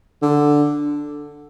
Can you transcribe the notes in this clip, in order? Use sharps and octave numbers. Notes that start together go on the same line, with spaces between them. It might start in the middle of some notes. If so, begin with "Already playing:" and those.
D3